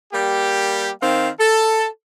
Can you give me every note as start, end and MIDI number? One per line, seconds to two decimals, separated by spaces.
0.13 0.90 55
0.13 0.90 58
0.13 0.90 67
1.02 1.29 51
1.02 1.29 60
1.02 1.29 77
1.39 1.87 69